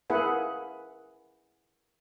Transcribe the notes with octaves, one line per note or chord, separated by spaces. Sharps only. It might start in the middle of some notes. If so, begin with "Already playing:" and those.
A#3 E4 G#4 B4 F#5